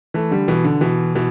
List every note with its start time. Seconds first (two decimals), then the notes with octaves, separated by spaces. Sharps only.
0.14 E3 A3
0.31 D3 G3
0.48 B2 E3
0.64 D3
0.81 B2 E3
1.15 B2 E3